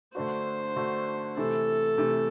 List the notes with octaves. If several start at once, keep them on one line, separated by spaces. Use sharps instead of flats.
D3 A3 D4 F#4 C5
D3 A3 D4 F#4
C3 E3 A3 A4
C3 E3 A3